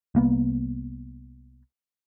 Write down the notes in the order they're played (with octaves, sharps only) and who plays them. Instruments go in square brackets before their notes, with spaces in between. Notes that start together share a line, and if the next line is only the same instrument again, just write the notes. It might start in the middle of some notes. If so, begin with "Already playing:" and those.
[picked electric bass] C2 A#3 B3